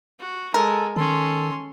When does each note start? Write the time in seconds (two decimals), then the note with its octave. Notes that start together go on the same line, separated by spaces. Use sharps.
0.20 F#4
0.54 G#3 A4 A#4
0.96 D#3 C#4 A4 C6